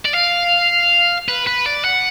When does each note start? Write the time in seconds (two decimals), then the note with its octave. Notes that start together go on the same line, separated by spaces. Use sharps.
0.05 D5
0.14 F5
1.28 B4
1.47 B4
1.66 D5
1.85 F#5